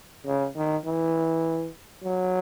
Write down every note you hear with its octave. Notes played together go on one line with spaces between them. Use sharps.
C#3
D#3
E3
F#3